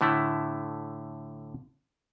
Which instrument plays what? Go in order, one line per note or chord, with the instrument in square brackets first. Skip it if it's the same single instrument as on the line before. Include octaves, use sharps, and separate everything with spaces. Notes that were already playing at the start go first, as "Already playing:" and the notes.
[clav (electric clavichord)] A2 D3 A3 E4